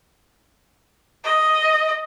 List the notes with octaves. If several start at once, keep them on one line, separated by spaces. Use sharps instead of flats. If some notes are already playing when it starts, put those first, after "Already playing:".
D#5